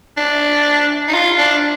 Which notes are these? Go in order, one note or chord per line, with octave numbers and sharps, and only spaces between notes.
D4
D#4
F4
D4